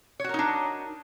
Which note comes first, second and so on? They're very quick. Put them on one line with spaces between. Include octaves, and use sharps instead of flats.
C#5 F#4 A#4 D#4 D4